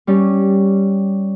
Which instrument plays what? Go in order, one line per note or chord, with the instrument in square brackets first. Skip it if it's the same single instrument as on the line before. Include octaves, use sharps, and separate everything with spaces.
[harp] G3 C#4 G4